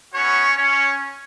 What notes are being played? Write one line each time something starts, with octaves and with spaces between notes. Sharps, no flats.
B3 C#4 F#4 C#5
C#4 C#5